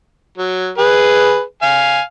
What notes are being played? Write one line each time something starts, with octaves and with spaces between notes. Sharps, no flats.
F#3
G#4 B4
F5 G#5